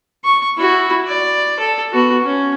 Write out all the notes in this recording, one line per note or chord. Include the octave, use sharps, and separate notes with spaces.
C#6
E4 F#4
D5
A4
B3 F#4
C#4